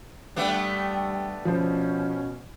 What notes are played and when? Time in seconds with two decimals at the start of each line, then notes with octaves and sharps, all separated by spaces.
0.36 G3 A3 B3 D4 G5
1.45 B2 F3 C#4 C5